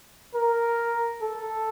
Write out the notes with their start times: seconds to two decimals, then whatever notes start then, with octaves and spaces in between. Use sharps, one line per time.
0.35 A#4
1.22 A4